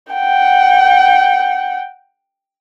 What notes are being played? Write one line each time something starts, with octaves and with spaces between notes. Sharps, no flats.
F#5 G5